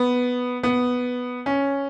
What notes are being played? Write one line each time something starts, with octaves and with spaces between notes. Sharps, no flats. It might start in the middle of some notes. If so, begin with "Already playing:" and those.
Already playing: B3
B3
C#4